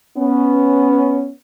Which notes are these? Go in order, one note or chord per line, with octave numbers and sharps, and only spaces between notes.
B3 C#4